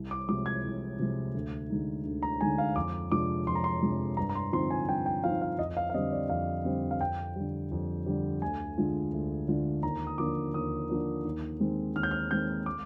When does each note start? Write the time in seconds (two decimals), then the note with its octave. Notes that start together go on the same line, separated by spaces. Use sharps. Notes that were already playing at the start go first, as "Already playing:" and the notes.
Already playing: C2
0.11 D6
0.29 C3 F3 G#3 D6
0.46 G#6
0.64 C2
0.99 C3 F3 G#3
1.34 D2
1.70 D3 G#3 D#4
2.05 D2
2.23 A#5
2.41 D3 G#3 D#4 G#5
2.58 F5
2.76 F2 D6
3.11 C3 F3 G#3 D4 D6
3.47 F2 C6
3.55 A#5
3.64 C6
3.82 C3 F3 G#3 D4
4.17 G2 A#5
4.29 A#5
4.35 C6
4.52 D3 F3 C4 D#4 C6
4.71 G#5
4.88 G2 G5
5.06 G5
5.24 D3 F3 C4 D#4 F5
5.41 F5
5.59 F2 D#5
5.77 F5
5.90 F5
5.94 D3 G3 C4 D#5
6.12 D5
6.30 F2 F5
6.65 D3 G3 C4
6.91 F5
7.00 F2 G5
7.36 D3 G3
7.71 F2
8.06 D3 G3
8.42 D2 G#5
8.77 D3 G#3 D4 F4
9.13 D2
9.48 D3 G#3 D4 F4
9.83 D#2 A#5
10.07 D#6
10.18 D3 F3 A#3 D4 D6
10.54 D#2 D#6
10.90 D3 F3 A#3 D4
11.25 D#2
11.60 D#3 G#3 C4
11.96 D#2 F6
12.03 G6
12.11 F6
12.31 D#3 G#3 C4 G6
12.66 D6